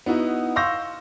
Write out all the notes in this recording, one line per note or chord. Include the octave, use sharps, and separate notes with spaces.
B3 D#4 E4 F#4
F5 C6 C#6 E6 G6 A#6